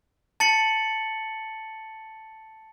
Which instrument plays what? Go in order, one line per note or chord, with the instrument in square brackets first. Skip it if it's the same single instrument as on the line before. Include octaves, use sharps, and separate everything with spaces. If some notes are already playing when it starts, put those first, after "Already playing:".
[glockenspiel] A5 A6 C#7 F#7